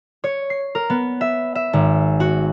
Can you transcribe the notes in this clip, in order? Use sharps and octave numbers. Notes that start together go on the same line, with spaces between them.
C#5
C7
A#4
B3
E5
E5
G#1
F#4